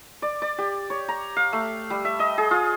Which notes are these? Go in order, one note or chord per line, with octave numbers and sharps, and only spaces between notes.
D5
D5
G4
C#5
A#5
F5
A3
G3
E5
D#5
G#4
F4